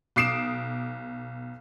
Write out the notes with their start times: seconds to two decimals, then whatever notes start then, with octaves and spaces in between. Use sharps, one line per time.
0.16 B1 D6 D#6 C7 D7 E7